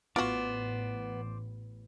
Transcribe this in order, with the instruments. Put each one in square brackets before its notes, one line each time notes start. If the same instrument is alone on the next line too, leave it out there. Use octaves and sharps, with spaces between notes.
[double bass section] A1 [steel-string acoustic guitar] B3 [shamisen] F4 F#4 [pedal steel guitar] C5 D5